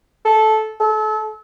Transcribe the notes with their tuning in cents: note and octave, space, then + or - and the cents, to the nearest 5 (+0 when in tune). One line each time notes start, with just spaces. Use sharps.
A4 -15
A4 -35